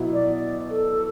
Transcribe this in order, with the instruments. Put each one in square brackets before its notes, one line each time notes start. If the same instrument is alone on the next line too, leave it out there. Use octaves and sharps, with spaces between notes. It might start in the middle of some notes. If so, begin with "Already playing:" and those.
Already playing: [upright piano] B2 F#3 B3 E4
[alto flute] D5
A4